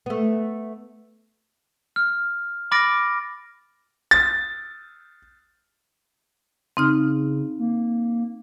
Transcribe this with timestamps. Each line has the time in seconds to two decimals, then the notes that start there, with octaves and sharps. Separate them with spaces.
0.06 A3 B3
1.96 F6
2.71 B5 D6 F6 A6 A#6 D7
4.11 A6
6.77 C#3 C4 D#4 F6
7.59 A#3